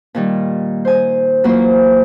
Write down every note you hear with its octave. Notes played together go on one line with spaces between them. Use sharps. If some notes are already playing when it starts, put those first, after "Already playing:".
A#2 D#3 G3
C5 G#5
E3 F#3 A#3 F4 F#4 C5